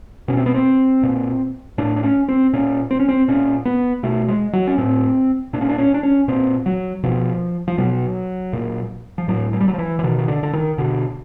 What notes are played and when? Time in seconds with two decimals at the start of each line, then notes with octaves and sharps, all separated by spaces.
0.28 B2 C#4
0.37 C4
0.46 B3
0.54 C4
1.03 A#2
1.78 A2 D4
1.96 D4
2.03 C#4
2.28 C4
2.53 A#2 C#4
2.91 C4
3.00 C#4
3.09 C4
3.28 A#2 C#4
3.65 B3
4.03 B2 A3
4.28 G#3
4.53 F#3
4.67 C#4
4.78 A2 C4
5.53 A#2 D4
5.61 C#4
5.69 D4
5.78 C#4
5.94 D4
6.03 C#4
6.28 A#2 C4
6.66 F#3
7.03 B2 F3
7.68 F3
7.78 B2 F#3
8.53 A#2
9.18 F3
9.28 A2 F#3
9.53 F#3
9.60 G3
9.68 F#3
9.74 F3
9.78 E3
9.99 E3
10.03 B2 D#3
10.18 D#3
10.28 D3
10.43 D3
10.53 D#3
10.78 B2 D3